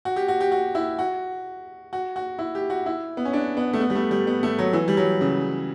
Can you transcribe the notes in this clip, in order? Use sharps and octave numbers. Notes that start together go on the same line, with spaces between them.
F#4
G4
F#4
G4
F#4
E4
F#4
F#4
F#4
E4
G4
F#4
E4
B3
C#4
D4
B3
A3
B3
G3
A3
G3
B3
A3
F#3
E3
G3
F#3
C#3